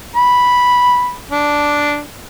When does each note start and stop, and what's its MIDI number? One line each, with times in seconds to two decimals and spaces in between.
0.16 1.15 83
1.31 2.00 62